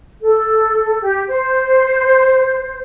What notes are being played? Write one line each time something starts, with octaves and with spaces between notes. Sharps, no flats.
A4
G4
C5